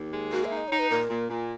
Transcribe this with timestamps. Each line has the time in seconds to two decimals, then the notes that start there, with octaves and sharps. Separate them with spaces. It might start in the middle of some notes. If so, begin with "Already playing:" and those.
Already playing: D#2
0.13 G#3
0.32 A#3 F#4
0.45 E5
0.52 D#4
0.57 D#5
0.68 D#4 C#5
0.79 B4
0.91 A#2 A#4
1.10 A#2
1.29 A#2